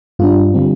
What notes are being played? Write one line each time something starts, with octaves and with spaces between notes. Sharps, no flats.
G2 G3 D4 F4
D3 G3 C4